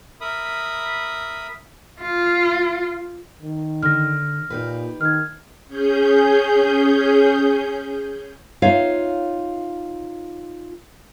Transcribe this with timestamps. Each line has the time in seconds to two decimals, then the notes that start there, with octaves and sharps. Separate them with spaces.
0.21 A#4 E5 B5 D#6
2.02 F4
3.42 D#3
3.83 D3 F6 A#6
4.50 A#2 D#4 G4 B4
5.01 D#3 F6 G#6
5.67 C#4 G#4 G6
8.62 D#4 F4 C#5 E5 F5